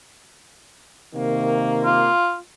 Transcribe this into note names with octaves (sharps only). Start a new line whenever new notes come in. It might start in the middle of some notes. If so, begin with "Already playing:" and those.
C3 D#3 A#3
F4